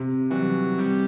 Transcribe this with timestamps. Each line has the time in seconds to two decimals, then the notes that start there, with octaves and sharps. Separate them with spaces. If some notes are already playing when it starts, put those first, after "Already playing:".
Already playing: C3
0.30 E3 F#3 G3
0.78 C3 G3